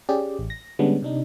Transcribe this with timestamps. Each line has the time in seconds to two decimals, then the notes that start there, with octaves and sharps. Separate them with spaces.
0.09 C#4 G4 G#4 D5
0.39 A1
0.50 A#6
0.79 D3 G3 G#3 B3 C#4 D4
1.02 C3 D4 D#4